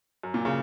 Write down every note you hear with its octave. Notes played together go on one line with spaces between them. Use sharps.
F#2
A#2
C#3